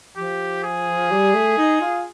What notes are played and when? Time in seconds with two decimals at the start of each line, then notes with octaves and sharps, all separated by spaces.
0.17 F3 G4
0.64 G#4
1.11 G3
1.34 A3
1.58 D#4
1.81 F4